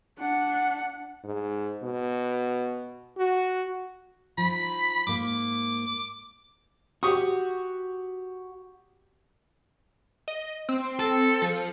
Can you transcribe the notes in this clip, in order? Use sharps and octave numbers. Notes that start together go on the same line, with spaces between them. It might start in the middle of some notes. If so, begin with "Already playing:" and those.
D4 F#5
G#2
B2
F#4
F3 D#4 B5
G#2 A#3 D6
F#4 G4 C#6 D#6
D#5
C4
A4
F3